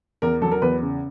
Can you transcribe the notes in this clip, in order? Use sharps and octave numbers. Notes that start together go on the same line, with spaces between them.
E2 A#4
F#3 A4
A#4
E2 B4
C#3